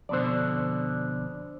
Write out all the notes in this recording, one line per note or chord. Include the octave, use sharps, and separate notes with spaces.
F2 B2 D3 C5 D5